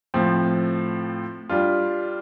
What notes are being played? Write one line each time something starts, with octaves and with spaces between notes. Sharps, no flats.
A2 F3 C4
G3 D4 F4